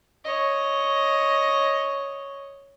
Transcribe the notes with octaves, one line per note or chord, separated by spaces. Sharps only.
C#5 D#5